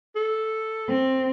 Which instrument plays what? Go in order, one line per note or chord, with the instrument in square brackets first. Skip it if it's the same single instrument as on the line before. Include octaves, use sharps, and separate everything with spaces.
[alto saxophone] A4
[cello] C4